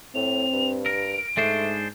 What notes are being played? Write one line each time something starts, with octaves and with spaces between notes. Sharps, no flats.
A2 C4 F7
G2
A#4 D7
G#2 G#3 A3 D4 C5